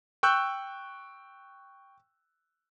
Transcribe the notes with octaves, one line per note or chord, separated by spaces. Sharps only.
G5 C#6 E6 F#6 G6